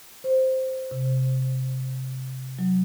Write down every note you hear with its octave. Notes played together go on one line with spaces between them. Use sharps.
C5
C3
F#3